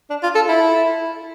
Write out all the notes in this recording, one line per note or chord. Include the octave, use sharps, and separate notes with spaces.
D4
F4
A4
E4